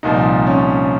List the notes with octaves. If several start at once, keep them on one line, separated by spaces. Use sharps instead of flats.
C2 A#2 F3 D#4
C#4